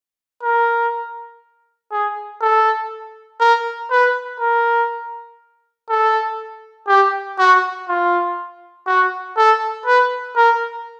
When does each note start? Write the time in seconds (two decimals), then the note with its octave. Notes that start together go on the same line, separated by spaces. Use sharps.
0.43 A#4
1.92 G#4
2.42 A4
3.40 A#4
3.91 B4
4.40 A#4
5.90 A4
6.88 G4
7.39 F#4
7.88 F4
8.87 F#4
9.37 A4
9.86 B4
10.37 A#4